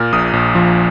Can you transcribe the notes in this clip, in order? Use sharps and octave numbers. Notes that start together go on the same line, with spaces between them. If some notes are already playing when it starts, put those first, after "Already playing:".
Already playing: A#2 A#3 F6
A#1 D#6
A#1
F3